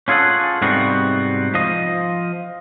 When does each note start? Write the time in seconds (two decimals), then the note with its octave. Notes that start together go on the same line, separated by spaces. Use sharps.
0.08 C#4 F4 G#4 A4 F#5
0.62 G#2 C3 G3 B3 C4 F#4
1.54 F3 D#5